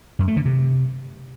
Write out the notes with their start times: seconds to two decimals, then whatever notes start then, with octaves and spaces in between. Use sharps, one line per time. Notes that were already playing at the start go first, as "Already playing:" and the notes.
0.19 F#2
0.28 A3
0.37 D3
0.45 C3